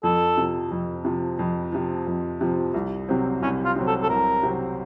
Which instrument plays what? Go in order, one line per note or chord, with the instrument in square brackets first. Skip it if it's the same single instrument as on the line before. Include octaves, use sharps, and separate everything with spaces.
[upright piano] F2 [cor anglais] A4
[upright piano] C3 F3
F2
C3 F3
F2
C3 F3
F2
C3 F3
C2
C3 F#3 C4
[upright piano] C2 [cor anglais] C#4
[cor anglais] F4
[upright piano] C3 F#3 C4
[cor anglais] A4
A4
[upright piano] C2 [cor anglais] A#4
[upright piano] C3 F#3 C4